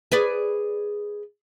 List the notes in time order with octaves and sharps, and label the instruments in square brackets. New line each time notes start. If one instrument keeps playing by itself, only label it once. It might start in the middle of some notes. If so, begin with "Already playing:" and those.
[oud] G#4 B4 D5